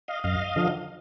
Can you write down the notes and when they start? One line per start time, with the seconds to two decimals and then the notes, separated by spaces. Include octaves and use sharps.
0.08 D#5 F5
0.24 F#2 D#5 F5
0.56 D3 F3